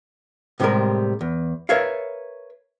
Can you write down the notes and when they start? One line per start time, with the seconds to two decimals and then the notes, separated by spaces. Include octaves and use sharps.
0.60 A2 C3 E3 G3 G#3 A#4
1.21 E2
1.69 A#4 B4 C#5 E5 F5